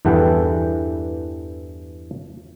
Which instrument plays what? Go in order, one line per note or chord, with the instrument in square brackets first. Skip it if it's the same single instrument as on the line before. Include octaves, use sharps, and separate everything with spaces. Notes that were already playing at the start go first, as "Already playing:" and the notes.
[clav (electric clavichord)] E2 G2 E3 A4 F#5 G5